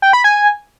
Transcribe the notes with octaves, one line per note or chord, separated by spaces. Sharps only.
G5
B5
G#5